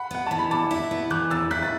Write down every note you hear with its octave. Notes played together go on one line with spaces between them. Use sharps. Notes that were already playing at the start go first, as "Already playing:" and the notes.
Already playing: F#5 B5
B3 F#5
E3 A5
B5
E2 A5 D6
E4
B3
E3 D6 F#6
E2 E6 A6
E4 F#6 B6
A6